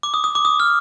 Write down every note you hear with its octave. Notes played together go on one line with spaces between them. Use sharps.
D6
D#6
D#6
D6
D#6
F6